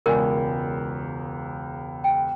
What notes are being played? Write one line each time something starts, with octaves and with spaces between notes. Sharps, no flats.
E1 C#2 A#4 D5 G#5
G5